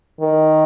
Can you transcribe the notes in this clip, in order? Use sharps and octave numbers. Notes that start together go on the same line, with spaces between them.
D#3